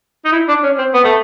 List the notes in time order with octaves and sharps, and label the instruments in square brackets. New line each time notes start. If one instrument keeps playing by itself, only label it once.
[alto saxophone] D#4
E4
D4
C#4
C4
B3
A3